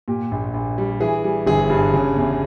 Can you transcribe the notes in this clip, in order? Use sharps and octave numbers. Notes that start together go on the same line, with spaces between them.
A#2 G4
A#1
A#1
G3
E3 G#4
G3
G1 G#4
G2
C#3
E2